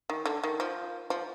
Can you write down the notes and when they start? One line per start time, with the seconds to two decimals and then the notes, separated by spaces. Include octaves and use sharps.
0.10 D#3
0.26 D3
0.44 D#3
0.60 F3
1.10 F3